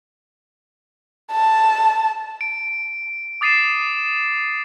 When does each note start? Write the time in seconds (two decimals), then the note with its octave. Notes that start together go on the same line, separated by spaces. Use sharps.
1.32 A5
2.41 D7
3.41 D6 D#6 A6 C7 D#7 E7